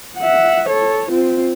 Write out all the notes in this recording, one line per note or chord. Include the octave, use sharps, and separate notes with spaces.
E5 F#5
A4 C#5
C4 F4